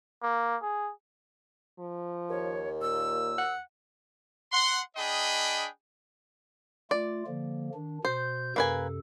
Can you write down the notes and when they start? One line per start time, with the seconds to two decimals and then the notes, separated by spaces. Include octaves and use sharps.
0.22 A#3
0.62 G#4
1.79 F3
2.29 D#2 C#5
2.82 A#2 E6
3.38 F#5
4.52 F#5 C6
4.96 D4 G#4 D#5 G5 B5
6.91 A3 F4 D5
7.27 D3 F3 A#3
7.74 D#3 D4
8.05 B2 C5 G6
8.56 F#2 C3 A#3 A4 B4 G#5